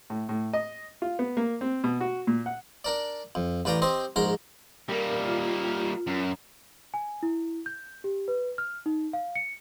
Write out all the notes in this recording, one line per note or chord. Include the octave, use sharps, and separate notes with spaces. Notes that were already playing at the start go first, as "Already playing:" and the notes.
A2
A2
D#5
F4
B3
A#3
C4
B2
F#4
A#2
F#5
D4 A#4 D5
F2
A1 B4 D5 F5 G5 A#5
C4 G4 C5 D#5
A#1 G#2 A#4 C6
G3 A#3 A#4
F4
F#2
G#5
E4
G6
G4
B4
F6
D#4
F5
C#7